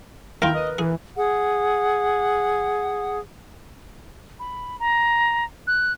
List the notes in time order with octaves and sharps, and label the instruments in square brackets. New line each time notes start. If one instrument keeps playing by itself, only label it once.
[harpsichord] D#2 A#3 F4 [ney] E4 [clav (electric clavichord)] A#4 [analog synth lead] G5
[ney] B4 [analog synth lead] D#5
[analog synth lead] E3 [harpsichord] G#4
[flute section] G#4 F#5
[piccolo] B5
A#5
F#6